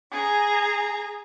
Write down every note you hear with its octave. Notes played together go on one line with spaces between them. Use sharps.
G#4 A#5